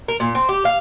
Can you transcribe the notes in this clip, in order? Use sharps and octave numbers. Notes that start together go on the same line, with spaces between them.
A#4
A#2
C4
G4
F5